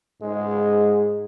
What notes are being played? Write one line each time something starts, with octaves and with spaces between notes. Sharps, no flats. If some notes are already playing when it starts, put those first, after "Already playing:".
G#2 G#3